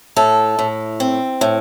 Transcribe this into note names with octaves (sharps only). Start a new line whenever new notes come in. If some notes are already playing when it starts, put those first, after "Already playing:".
A2 A4
A2
C4
A2